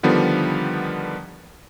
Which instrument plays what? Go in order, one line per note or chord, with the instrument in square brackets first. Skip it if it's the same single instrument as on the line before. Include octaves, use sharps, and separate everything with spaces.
[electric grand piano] D3 D#3 F3 G3 B3